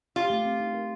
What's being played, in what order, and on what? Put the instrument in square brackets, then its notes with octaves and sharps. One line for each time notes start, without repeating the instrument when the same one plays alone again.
[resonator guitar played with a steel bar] F4 [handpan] G4
[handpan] A3
C4
D#4
A#4